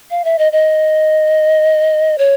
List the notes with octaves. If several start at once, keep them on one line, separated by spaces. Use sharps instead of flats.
F5
E5
D#5
D#5
C#5